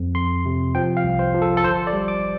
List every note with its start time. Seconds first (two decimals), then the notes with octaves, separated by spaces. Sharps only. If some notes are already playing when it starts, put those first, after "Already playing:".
Already playing: F2
0.15 F2 C6
0.45 C3
0.75 F3 G5
0.97 F5
1.04 C2
1.19 C5
1.34 F3
1.42 A4
1.57 A4
1.64 G1 C5
1.87 D5
1.93 G3
2.08 D6